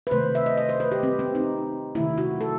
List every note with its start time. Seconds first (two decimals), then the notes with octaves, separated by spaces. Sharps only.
0.07 B4
0.11 C3 D#3 A3 C5
0.35 E5
0.46 D#5
0.57 D#5
0.69 C5
0.80 B4
0.92 G4
1.03 C4
1.19 C4
1.35 D#4
1.95 C3 D#3 A3 E4
2.18 F#4
2.41 A4